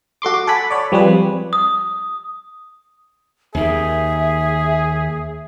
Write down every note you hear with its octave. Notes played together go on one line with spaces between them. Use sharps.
F#4 A4 C6 D6
D6
A4 F#5 G#5 B5
C#5 D5
F3 G3 C4 G#4 B4
D#6
D#2 D#3 G#4 E5